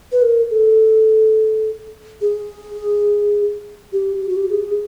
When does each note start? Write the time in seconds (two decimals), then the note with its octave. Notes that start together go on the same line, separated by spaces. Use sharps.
0.12 B4
0.22 A#4
0.51 A4
2.21 G#4
3.93 G4
4.21 G4
4.29 F#4
4.36 G4
4.50 G#4